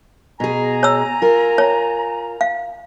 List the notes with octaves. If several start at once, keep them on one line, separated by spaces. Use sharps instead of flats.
B2 G#4 G#5 A#5
C#5 E6
F4 A#4
C#5
F5